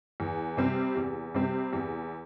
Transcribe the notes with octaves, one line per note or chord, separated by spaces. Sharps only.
E2
C3 G3 C4 G4
E2
C3 G3 C4 G4
E2